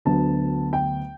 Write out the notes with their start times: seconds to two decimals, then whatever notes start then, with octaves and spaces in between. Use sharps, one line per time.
0.05 D2 D3 F#3 B3 A5
0.73 G5